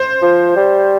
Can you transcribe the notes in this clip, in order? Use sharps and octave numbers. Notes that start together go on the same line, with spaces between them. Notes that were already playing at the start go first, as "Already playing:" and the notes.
Already playing: C5
F3
G3